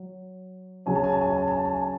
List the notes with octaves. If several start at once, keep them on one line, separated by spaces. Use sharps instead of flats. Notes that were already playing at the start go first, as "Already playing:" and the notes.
Already playing: F#3
C#3 F#3 C#4 G#5
A5
G#5
A5
G#5
A5
G#5
A5
G#5
A5
G#5
A5